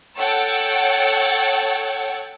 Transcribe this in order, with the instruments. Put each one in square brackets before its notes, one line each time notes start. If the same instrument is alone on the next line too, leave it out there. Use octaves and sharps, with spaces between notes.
[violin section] A4 C#5 F#5 G5 E6 A6